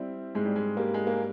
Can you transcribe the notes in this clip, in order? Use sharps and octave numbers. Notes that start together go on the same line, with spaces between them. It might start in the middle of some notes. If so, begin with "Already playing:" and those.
Already playing: G3 C4 E4
G#2 G#3
G3
G#3
G3 A#3
G#3
A#3